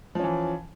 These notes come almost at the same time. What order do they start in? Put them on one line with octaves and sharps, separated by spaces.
F3 C#4 E3